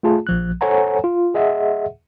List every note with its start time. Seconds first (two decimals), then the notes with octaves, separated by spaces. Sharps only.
0.03 A3 F4 G#4 A5
0.27 A#1 F3 F#6
0.61 A4 C5 C#5 F#5 G#5 A#5
1.04 F4
1.34 G#4 D#5 E5 F#5